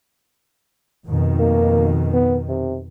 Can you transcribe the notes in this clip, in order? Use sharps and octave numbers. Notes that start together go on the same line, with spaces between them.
F2 B2 D#3
A#3
B3
C3